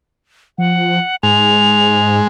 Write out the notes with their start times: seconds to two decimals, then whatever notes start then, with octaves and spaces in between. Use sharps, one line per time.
0.58 F3 F#5
1.23 G#2 G#3 F7